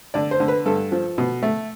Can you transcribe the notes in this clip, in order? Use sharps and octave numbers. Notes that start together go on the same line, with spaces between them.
D3 D5
C5
D3
B4
G2 A4
F3
B2
A3